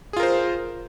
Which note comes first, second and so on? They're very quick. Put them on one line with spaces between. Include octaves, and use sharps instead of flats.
G#4 F4 A#4 C5